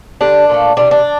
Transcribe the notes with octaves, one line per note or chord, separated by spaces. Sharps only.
D3 G3 D4
A#2 F3 A3
C3 E3 G3 D4
D4